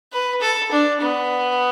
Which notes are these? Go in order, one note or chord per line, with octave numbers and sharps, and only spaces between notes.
B4
A4
D4
B3